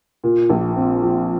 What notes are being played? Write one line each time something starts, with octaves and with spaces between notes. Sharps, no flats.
A#2
A#1
C4
F3